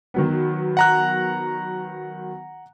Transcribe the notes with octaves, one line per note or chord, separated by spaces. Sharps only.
D#3 F#3 B3
F#5 A#5 F#6